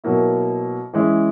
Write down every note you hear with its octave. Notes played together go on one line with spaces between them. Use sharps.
B2 F#3 A#3 E4
E3 G#3 C#4 E4